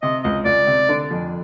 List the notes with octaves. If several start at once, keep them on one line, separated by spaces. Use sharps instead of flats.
C3 D#5
C#2 D#5
C#2 D5
C3
D3
F2